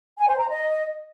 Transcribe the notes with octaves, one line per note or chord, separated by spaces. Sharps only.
G#5
C5
A#5
D#5